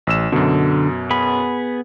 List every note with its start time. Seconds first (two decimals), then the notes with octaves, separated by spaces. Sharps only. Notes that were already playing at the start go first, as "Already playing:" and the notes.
0.07 A1 E6 E7
0.32 F#2 B2 D3
1.10 B3 G#4 B5